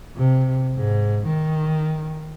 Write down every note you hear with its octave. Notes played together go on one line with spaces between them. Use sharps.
C3
G#2
D#3